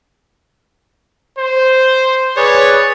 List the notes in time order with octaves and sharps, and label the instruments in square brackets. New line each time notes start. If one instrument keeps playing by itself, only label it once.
[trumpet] C5
[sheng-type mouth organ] G#4 B4 D5 [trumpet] C#5